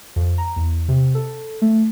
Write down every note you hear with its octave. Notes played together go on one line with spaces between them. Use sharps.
F2
A#5
E2
C3
A4
A3